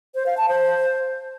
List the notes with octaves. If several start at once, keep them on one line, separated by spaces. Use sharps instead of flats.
C5
F5
A5
C5